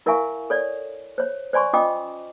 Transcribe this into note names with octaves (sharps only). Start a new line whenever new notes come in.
E4 A#4 E5 F5 G#5 C#6
A4 C#5 D5
C5 C#5
C5 D5 G#5 C6 C#6
C#4 F4 D#5 G5 D6 D#6